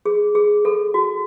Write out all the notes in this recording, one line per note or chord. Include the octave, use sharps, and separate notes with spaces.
G#4
G#4
A4
F#4